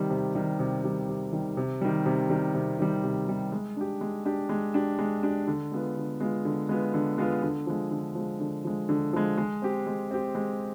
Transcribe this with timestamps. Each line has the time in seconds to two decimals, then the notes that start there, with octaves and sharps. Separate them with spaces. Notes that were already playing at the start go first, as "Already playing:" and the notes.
Already playing: C3 D#3 G3
0.10 C3
0.35 D#3 G3
0.59 C3
0.84 D#3 G3
1.09 C3
1.33 D#3 G3
1.57 C3
1.81 D#3 G3
2.06 C3
2.30 D#3 G3
2.54 C3
2.79 D#3 G3
3.04 C3
3.28 D#3 G3
3.52 G#3
3.77 D4 G4
4.01 G#3
4.25 D4 G4
4.49 G#3
4.74 D4 G4
4.99 G#3
5.23 D4 G4
5.47 D3
5.72 G#3 B3 F4
5.96 D3
6.20 G#3 B3 F4
6.45 D3
6.69 G#3 B3 F4
6.94 D3
7.18 G#3 B3 F4
7.42 D3
7.67 F3 G#3
7.91 D3
8.15 F3 G#3
8.40 D3
8.64 F3 G#3
8.89 D3
9.13 F3 G#3
9.38 G#3
9.62 C4 G4
9.86 G#3
10.11 C4 G4
10.35 G#3